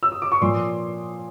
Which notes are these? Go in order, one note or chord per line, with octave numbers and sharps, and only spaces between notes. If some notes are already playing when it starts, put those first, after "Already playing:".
E6
D#6
D6
C#6
A#2 F3 C6